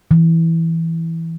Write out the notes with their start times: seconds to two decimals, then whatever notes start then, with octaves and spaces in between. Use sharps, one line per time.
0.11 E3